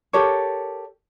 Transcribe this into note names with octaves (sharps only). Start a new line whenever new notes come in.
G4 A4 A#4 C#5